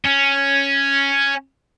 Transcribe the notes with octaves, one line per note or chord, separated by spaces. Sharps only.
C#4